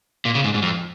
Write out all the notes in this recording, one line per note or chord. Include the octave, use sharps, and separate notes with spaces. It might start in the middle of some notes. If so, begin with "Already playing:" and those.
A#2
C#3
G#2
G#2
F2